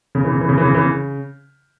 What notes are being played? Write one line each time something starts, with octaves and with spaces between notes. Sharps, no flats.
C#3
E3
C#3
E3
C#3
E3
C#3
E3
C#3